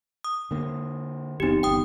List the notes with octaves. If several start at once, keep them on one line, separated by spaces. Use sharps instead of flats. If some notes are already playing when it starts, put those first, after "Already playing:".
D#6
D3 A#3
F#1 E2 C4 D#4 G4
G1 E2 G5 D#6